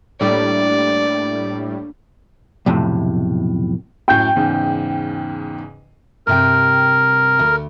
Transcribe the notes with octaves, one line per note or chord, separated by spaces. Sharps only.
A2 G3 A#3 D4 D5
B1 F2 A2 C3
F#2 A2 G5 G6
E2 G#2 C#3
G2 C3 A#4 G5
D2